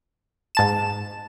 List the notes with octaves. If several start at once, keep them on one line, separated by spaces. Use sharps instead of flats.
G#2 A5 E7